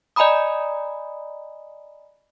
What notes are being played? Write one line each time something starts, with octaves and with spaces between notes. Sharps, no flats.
D5 D#5 G#5 A#5 B5 D#6